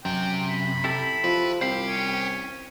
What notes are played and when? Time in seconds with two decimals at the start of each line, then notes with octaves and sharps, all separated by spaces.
0.05 F#2 C3 G5
0.51 B5
0.84 E4 G4 A4
1.24 F3 B4
1.61 C2 G4 C5 F5 B5
1.88 C#4